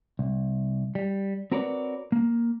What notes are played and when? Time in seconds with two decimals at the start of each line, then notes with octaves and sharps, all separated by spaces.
0.19 C2
0.95 G3
1.52 C4 F#4 A#4 B4 C#5 D5
2.12 A#3